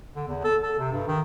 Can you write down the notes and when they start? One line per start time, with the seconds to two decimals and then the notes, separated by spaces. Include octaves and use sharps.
0.16 D3
0.28 E2
0.44 A4
0.63 A4
0.79 C3
0.92 G2
1.08 D#3